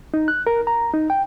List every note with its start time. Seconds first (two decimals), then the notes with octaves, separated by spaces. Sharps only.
0.14 D#4
0.28 F#6
0.47 A#4
0.67 A#5
0.94 D#4
1.10 G5